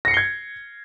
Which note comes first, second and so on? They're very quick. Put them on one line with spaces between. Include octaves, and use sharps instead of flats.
A#6 C#7 C7 G7 G#6